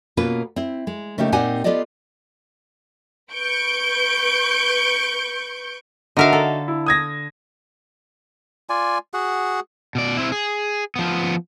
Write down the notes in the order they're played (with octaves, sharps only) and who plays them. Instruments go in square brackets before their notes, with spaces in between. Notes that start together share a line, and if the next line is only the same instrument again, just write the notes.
[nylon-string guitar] B2 A#3 B3 C#4 F4 B4
C4 E4
G#3
C#3 A3 A#3 D#4 G4
A#2 C4 D#4 G4 F#5 G#5
B3 F4 G4 A4 D5 D#5
[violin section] B4 C#6 G6 D7
[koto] D3 A#4 F5 [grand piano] D#4 F#4 E5
[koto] A4
[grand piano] E4
D#6 G#6 A#6
[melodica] F4 D5 G#5
F#4 G#4 F#5
[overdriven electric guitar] B2 D5
C4 E4
G#4
F3 B3